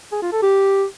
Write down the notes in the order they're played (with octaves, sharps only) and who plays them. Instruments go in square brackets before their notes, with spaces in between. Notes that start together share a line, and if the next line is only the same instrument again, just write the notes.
[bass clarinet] G#4
F4
A4
G4